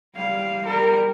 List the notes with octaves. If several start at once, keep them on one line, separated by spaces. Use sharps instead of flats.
G3 F5
G3 A#4